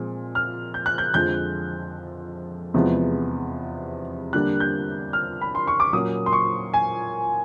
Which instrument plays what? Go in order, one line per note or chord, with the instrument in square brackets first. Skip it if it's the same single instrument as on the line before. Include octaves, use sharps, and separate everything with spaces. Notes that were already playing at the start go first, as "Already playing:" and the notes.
Already playing: [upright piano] A#2 F3 G#3 C4
F6
G6
F#6
G6
F2 D3 F3 G#3 G6
E2 C3 F3 G#3 B3
D3 G3 A#3 D4 F#6
G6
F6
B5
C6
C#6
D6
A#2 F#3 A#3 C#4 D#6
C6
C#6
G#5